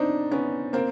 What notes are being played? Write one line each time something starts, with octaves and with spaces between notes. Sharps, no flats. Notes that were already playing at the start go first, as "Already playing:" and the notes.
Already playing: C4 D4 D#4
B3 C#4
A#3 C4